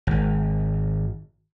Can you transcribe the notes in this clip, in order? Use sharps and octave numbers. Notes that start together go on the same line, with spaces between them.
G#1